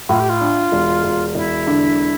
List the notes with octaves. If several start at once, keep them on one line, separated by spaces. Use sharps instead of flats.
A2 F4
G4
F4
D4
E1
E1
E1 E4
D3